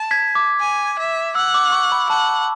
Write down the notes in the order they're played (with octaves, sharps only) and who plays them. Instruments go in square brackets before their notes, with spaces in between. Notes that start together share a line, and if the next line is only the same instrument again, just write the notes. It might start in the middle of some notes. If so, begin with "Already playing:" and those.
Already playing: [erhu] A5
[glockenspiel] G#6 B6
D6
[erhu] G#5
E5
[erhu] F#5 [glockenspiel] E6
[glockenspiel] D6
C#6
B5
[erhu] F#5 [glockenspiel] A5